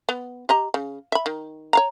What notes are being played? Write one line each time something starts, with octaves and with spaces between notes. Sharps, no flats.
B3
G4 D#5 A#5
C#3
E5 B5
D#3
C#5 F5 A#5